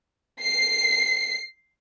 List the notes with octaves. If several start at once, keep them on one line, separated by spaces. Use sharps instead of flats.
C7